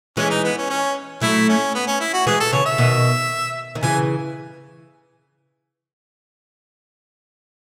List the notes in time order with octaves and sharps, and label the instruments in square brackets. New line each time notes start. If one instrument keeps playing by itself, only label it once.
[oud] E3 G#3 [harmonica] C#4
[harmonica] D#4
B3
C#4
C#4
[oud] F#3 A3 [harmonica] E4
[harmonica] C#4
B3
C#4
E4
F#4
[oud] E3 G#3 [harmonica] G#4
[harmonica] A4
[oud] C#3 E3 [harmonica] C#5
[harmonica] E5
[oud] B2 D#3
D#3
[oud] C#3 E3 [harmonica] G#5